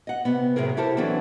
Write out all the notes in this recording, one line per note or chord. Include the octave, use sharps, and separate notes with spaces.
D#5 F#5
C3 B3
A2 C3 F#3 G#4 A#4
E4 G4 A4 A#4 C5
D3 E3 F#3 C4 D4 A4